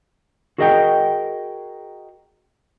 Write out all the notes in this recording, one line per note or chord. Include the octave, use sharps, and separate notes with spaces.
F#4 G#4 A#4 D#5 F#5 G5